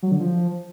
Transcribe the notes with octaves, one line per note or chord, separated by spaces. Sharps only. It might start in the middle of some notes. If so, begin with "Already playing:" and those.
F#3
D3
F3